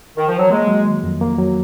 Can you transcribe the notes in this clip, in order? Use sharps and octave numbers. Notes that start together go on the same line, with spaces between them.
D#3
F3
F#3
G#3 A#3
F#3
D#3
F2
A#3
F#3